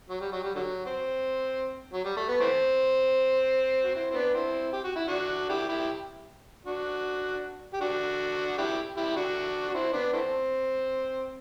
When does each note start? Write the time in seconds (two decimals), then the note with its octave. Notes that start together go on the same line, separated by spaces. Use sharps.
0.09 F#3
0.21 G3
0.32 F#3
0.43 G3
0.55 D3 F#3
0.86 C4
1.93 F#3
2.05 G3
2.16 A3
2.28 B3
2.40 E3 A3 C4
3.83 F#4
3.95 C4 E4
4.11 C4
4.14 B3 D4
4.34 C4 E4
4.73 G4
4.84 F#4
4.96 E4
5.07 D4 F#4
5.49 E4 G4
5.69 E4 G4
6.65 D4 F#4
7.74 G4
7.81 D4 F#4
8.58 E4 G4
8.97 E4 G4
9.16 D4 F#4
9.69 F#4
9.74 C4 E4
9.93 B3 D4
10.13 E3 A3 C4